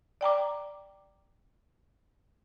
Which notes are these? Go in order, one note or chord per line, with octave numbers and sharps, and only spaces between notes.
D5 G5 A#5 D6